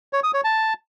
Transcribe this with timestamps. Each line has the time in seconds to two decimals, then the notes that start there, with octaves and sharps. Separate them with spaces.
0.13 C#5
0.23 D#6
0.34 C#5
0.44 A5